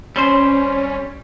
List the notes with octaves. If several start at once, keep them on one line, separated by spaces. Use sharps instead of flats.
G3 C4 C#4 C5